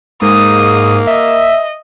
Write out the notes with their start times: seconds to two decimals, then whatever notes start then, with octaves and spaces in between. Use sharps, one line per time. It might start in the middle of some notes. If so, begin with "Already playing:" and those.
0.22 G#2 A#3 D#6
1.07 D#5 E5